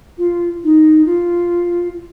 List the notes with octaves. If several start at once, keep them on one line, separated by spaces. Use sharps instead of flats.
F4
D#4
F4